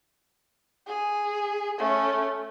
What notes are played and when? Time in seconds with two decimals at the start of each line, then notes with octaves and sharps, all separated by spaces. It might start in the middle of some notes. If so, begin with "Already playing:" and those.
0.87 G#4
1.78 A3 C#4